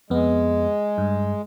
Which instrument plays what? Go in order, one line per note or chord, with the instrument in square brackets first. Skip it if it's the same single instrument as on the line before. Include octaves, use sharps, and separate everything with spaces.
[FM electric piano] F2 B3 [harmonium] G#3
[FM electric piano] G2